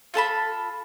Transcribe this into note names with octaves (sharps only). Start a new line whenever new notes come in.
F4 A4 A5 B5